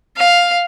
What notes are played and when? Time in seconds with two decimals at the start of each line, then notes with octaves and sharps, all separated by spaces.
0.17 F5